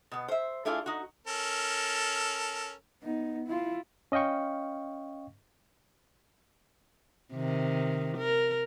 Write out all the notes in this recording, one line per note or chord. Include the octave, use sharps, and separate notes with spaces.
B2 B3
C5 E5
A3 D4 E4 F4 G#4 G#5
D#4 F#4
C#4 A4 A#4
B3 D#4
E4 F4
C#4 D#5 F5 G5 C#6
C3 D#3
A#4